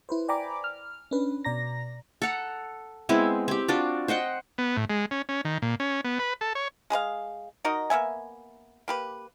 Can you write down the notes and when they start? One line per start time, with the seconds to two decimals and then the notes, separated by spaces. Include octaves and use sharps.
0.09 E4 B4 C5
0.28 D5 G5 G#5 A#5 B5 D6
0.64 F6
1.11 C#4 D4 B4
1.44 B2 D5 A#5 A#6
2.22 A4 F#5 A#5
3.09 G#3 B3 C4 E4
3.48 C4 G4
3.68 D4 F4 F#4 D5
4.08 C5 D#5 F#5 G5
4.58 B3
4.77 A2
4.90 G#3
5.11 C#4
5.29 C#4
5.45 D#3
5.62 A#2
5.80 C#4
6.05 B3
6.19 B4
6.41 A4
6.55 C#5
6.90 G#3 G#4 B4 F5
7.65 D#4 F#4 A#4 D#5
7.90 A#3 B3 E5 G#5
8.88 A#3 G4 B4